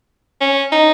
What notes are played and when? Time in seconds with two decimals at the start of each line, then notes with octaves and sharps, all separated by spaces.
0.41 C#4
0.72 D#4